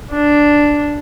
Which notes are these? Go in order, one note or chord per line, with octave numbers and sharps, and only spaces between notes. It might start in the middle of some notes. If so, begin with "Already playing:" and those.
D4